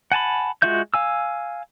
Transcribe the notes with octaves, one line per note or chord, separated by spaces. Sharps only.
F#5 G#5 A5 B5
G#3 F4 F#4 E5 G6
F5 G#5 E6